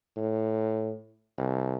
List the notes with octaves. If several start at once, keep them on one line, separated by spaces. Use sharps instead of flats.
A2
C2